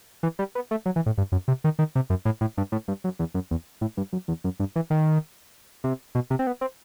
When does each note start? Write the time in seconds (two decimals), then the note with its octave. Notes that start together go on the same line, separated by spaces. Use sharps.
0.23 E3
0.39 G3
0.55 B3
0.71 A3
0.86 F#3
0.96 E3
1.06 A2
1.18 G2
1.32 F#2
1.48 C3
1.64 D#3
1.79 D#3
1.95 C3
2.10 F#2
2.25 A2
2.41 A2
2.57 G2
2.72 A2
2.88 G2
3.04 F#2
3.19 E2
3.34 F#2
3.51 E2
3.81 A2
3.97 G2
4.13 F#2
4.28 E2
4.44 F#2
4.60 G2
4.76 E3
4.90 D#3
5.84 C3
6.15 B2
6.30 C3
6.39 C4
6.47 B3
6.61 C4